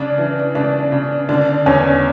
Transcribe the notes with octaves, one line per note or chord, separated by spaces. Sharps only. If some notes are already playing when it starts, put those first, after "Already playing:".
Already playing: C#3 D4
E3
C#3 D4
C#3
D3 D4
E2 C#4